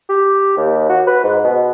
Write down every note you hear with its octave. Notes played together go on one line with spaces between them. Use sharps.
G4
D#2
F#4
B4
G#2
B2